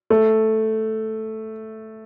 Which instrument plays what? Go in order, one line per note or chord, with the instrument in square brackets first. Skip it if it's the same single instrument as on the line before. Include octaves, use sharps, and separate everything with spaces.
[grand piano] A3